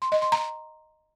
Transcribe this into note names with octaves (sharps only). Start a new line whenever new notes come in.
C6
D#5
C6
A#5